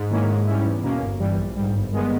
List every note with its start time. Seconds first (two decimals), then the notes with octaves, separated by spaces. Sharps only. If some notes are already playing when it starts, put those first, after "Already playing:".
Already playing: G#2
0.10 D#3 A#3 C#4 E4
0.28 G#2
0.46 G3 C#4 E4
0.65 E2
0.82 B2 A#3 C#4
1.01 G1
1.19 G2 E3 G3
1.37 A#1
1.56 G#2 G3
1.73 G1
1.91 G2 D#3 G#3 B3